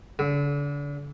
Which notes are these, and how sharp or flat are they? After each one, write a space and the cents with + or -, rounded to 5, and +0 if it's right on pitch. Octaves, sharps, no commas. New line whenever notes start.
D3 -35